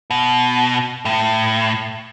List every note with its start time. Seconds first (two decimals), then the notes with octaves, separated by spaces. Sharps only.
0.10 B2
1.05 A2